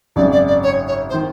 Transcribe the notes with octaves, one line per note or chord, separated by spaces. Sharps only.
G#1 F#2 C#3 D5
D5
D5
C#5
C#5
C5
D#3